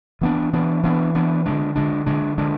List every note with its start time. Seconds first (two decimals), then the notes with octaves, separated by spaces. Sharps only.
0.21 E3 B3 D4
0.53 E3 B3 D4
0.83 E3 B3 D4
1.15 E3 B3 D4
1.46 D3 G#3 D4
1.75 D3 G#3 D4
2.06 D3 G#3 D4
2.38 D3 G#3 D4